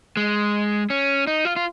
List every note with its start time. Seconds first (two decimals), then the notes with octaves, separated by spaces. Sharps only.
0.17 G#3
0.90 C#4
1.27 D#4
1.45 F4
1.56 F4